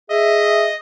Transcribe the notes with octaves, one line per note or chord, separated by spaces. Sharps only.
G#4 D#5 E5